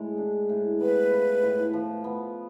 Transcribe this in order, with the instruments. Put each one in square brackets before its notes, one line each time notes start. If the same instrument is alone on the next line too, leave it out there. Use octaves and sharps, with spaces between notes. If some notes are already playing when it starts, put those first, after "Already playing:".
Already playing: [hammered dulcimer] A2 G#3
D4
A2
[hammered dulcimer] B3 [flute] B4
[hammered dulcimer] F4
A2
F3
B3